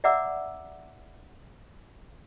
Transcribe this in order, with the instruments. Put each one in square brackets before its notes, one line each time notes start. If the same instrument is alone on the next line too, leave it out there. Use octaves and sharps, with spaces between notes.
[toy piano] D5 E5 F#5 A#5 D6 E6